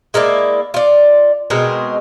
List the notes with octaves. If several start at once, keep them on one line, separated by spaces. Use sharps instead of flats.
G#3 A#3 E4 D5
F4 D5
B2 G#3 C4 A#4